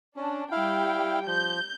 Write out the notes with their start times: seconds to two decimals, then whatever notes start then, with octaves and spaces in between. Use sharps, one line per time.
0.16 C#4 D4
0.51 G3 E4 F5 G5
1.27 F3 G6